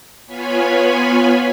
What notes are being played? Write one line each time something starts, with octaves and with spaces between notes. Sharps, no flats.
B3 F4 C#5 G#5 B5